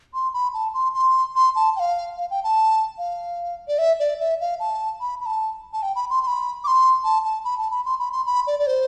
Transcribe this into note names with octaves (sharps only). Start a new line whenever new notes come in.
C6
B5
A5
C6
C6
C6
A5
G5
F5
F5
G5
A5
F5
D5
E5
D5
E5
F5
A5
B5
B5
A5
A5
G5
B5
C6
C6
B5
D6
C6
A5
A5
B5
A5
B5
C6
B5
C6
B5
D5
D5
C5